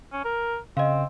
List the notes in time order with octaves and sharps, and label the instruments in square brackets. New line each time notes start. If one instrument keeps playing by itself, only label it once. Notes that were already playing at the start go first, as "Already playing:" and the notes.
[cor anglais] C#4
A#4
[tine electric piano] C#3 [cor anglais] C4 [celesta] D#5 F5